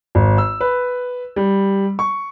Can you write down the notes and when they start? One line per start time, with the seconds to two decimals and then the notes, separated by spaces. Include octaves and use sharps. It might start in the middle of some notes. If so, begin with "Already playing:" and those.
0.15 G#1
0.38 E6
0.61 B4
1.36 G3
1.99 C#6